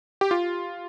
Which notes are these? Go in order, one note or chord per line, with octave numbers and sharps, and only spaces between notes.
G4
F4